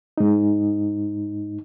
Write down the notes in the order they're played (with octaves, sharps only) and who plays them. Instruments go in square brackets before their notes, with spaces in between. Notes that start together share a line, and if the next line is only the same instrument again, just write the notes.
[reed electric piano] G#2 D#4